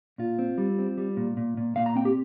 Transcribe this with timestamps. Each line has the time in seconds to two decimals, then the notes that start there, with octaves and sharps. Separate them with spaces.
0.18 A#2 F4
0.39 C4
0.58 G3
0.79 C4
0.98 G3
1.17 A#2
1.37 A#2
1.57 A#2
1.76 A#2 F5
1.86 A#5
1.95 C4 G5
2.05 G4